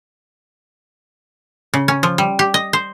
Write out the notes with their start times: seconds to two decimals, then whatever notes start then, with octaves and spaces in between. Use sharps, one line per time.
1.74 C#3
1.88 C#4
2.03 F3
2.18 G3
2.39 G4
2.54 D#5
2.73 C5